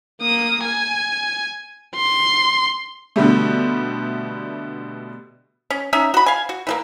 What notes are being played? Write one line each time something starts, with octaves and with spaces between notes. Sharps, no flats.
A#3 D#6
G#5
C6
B2 D3 G3 A3
C#4
C#4 D#4 E5
F#4 B5
F5 G#5
F#4
E3 F#3 A#3